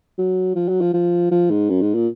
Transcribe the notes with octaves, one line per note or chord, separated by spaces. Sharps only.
F#3
F3
F#3
F3
F3
F3
G#2
F#2
G#2
A#2